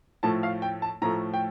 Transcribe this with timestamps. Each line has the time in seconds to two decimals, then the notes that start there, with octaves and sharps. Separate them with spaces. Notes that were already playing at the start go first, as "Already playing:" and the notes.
0.23 A2 F3 A3 A5
0.43 F5
0.62 G5
0.82 A5
1.02 A2 F3 A3 A#5
1.34 G5